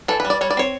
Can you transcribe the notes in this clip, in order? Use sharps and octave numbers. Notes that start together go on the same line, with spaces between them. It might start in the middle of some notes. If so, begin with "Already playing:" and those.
E3 A4
B4
G3
D5
G3 C#5
D5
C4 C#5